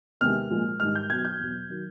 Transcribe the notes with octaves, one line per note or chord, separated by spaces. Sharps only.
E2 C3 D#3 G#3 F6
A#2 F3 G#3
G#2 D#3 G3 F6
G6
B2 F#3 G#6
G6
E2 B2 F#3
D#3 F#3